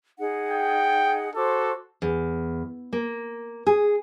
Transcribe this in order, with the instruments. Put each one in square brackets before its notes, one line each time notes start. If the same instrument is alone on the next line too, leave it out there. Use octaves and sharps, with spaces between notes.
[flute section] D#4 G#4 F#5
[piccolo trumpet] G5
[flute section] F#4 C5 D6 [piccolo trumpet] A4
[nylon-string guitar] E2
A#3
G#4